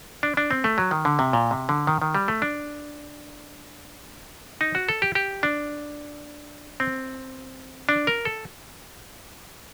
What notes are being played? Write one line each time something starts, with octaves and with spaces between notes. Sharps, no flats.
D4
D4
C4
A3
F#3
D#3
D3
C3
A#2
C3
D3
D#3
D#3
G3
A3
D4
D#4
F#4
A4
G4
G4
D4
C4
D4
A#4
A4